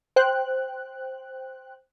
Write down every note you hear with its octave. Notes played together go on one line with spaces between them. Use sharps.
C5 G5 F#6